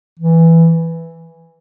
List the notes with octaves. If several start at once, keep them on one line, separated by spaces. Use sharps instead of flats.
E3